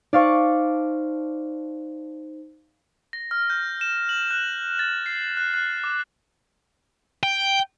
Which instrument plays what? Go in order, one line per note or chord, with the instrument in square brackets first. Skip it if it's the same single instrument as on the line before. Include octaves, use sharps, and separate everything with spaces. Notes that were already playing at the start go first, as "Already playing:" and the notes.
[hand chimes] D#4 C5 [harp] D5 F5 C#6
[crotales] A#6
F6
G6
E7
F#7
F#6
A6
C7
F#6
F#6
D6
[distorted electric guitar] G5